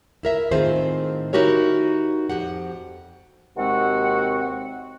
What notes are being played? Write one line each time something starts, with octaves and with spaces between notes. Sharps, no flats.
E4 A#4 E5
A2 D#3 C4 F4 G#4 C5
D#4 E4 F#4 G4 A#4 C#5
F2 G4 F#5
D#2 C3 G#3 C4 F#4 F#5